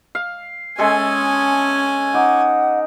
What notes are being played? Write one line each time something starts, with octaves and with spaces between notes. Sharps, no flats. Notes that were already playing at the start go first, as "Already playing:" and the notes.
F5
G#3 C#4 A4 E5 G#5
D#4 F#5 D6